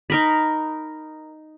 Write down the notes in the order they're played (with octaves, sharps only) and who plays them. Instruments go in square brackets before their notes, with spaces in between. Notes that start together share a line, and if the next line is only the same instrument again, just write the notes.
[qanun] D#4 A#4 B5